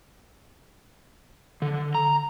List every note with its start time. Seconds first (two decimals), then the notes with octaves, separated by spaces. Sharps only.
1.62 D3
1.95 A#5